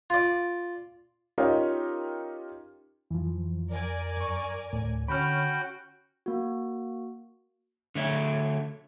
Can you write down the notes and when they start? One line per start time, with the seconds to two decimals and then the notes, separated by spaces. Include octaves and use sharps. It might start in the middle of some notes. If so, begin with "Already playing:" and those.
0.10 F4 D5
1.38 C#4 D#4 F4 G4 A#4 C#5
3.11 F2 E3 F3
3.70 A#4 D5 G#5
4.17 F#2 C#6
4.73 D2 A2
5.08 D3 C#4 F#4 G5 B5 F6
6.26 A#3 F#4
7.95 D3 A3 C#5